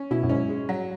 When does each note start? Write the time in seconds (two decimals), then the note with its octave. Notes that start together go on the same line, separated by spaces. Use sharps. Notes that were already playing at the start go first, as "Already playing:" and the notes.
Already playing: C#4
0.11 B2 E4
0.23 F#2
0.29 G#2 C#4
0.49 G#3
0.69 F#3